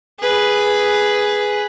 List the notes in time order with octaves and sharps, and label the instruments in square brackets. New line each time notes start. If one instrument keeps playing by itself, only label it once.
[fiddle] G#4 B4